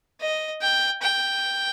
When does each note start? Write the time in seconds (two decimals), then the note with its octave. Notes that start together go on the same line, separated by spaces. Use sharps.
0.21 D#5
0.62 G5
1.02 G5